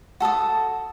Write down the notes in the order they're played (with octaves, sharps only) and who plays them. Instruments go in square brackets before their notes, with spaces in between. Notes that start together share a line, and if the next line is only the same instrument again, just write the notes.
[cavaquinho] F#4 A4 A5 D#6